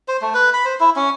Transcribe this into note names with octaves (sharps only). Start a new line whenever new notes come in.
C5
A3
B4
B5
C5
E4
C#4